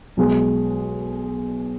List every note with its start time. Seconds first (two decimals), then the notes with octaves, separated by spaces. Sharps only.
0.17 B1 B2 G#3